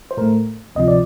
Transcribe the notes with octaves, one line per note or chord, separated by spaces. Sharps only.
C5
A2 A3 A#4
D2 C3 F3 D#5
D5